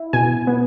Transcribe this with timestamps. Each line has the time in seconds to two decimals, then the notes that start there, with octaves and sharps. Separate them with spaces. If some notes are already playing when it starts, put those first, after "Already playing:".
Already playing: E4
0.13 B2 G#5
0.47 B3